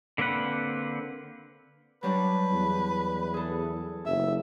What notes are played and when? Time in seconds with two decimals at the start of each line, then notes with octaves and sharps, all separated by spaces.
0.18 D3 A#3 C4 B4 F#5
2.03 F#3 G3 D4 B4
2.52 E2
3.34 G#4 A4
4.06 F#1 E5